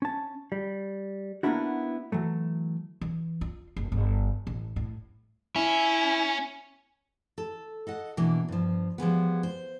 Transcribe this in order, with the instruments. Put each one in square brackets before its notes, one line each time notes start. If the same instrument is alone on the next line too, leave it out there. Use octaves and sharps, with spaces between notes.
[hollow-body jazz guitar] C#4 A5
G3
A#3 B3 C#4 D4 E4 F#4
E3 F#3 A3
[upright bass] E3
F4
F#1
G1
A1
A2
[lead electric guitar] C#4 [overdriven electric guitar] E4
[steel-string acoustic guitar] A4
A4 D#5 F#5
B2 E3 A#3 D4
G2 F3
F3 G3 G#3 B3
C5